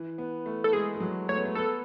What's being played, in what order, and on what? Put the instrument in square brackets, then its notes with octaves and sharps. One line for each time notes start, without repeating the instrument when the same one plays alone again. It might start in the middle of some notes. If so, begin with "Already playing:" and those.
Already playing: [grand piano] E3
B3
A3
[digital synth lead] A4
[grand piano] G#3 [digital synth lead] G#4
[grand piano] G#3
F#3
[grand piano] A3 [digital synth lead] C#5
[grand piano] B3
A3
[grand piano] B3 [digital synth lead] A4